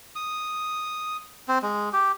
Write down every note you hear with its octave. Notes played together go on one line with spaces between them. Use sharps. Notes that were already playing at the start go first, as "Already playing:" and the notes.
D#6
C4
G#3
G4